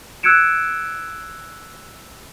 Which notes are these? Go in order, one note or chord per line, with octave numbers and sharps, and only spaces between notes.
E6 F#6 G#6 C#7 D7 E7